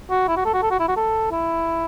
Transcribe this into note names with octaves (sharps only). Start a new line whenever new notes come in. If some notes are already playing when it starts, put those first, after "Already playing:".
F#4
E4
F#4
A4
F#4
A4
F#4
E4
F#4
A4
E4